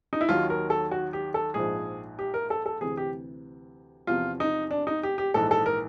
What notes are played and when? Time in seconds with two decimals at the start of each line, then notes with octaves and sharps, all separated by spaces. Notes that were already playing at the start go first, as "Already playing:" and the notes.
0.13 D#4
0.21 E4
0.29 D#2 D#3 F#3 F4
0.50 A#4
0.70 A4
0.91 F#4
1.13 G4
1.34 A4
1.54 A#1 G#2 F3 G#4
2.19 G4
2.34 A#4
2.50 A4
2.66 A4
2.81 D2 C3 E3 G#4
2.97 G4
4.07 E2 C3 F3 F4
4.40 D#4
4.71 D4
4.87 D#4
5.03 G4
5.18 G4
5.34 A#1 G#2 E3 A4
5.51 A4
5.66 A#4